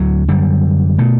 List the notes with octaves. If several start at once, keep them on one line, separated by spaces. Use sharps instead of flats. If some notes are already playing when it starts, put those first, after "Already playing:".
Already playing: D2 D3 F#3
F#2 D3 G3
B2 A3